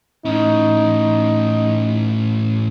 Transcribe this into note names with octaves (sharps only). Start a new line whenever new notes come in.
A2 C#4 D#4